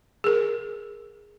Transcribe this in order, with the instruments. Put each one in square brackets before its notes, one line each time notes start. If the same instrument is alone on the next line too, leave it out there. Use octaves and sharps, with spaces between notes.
[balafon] G#4 A#4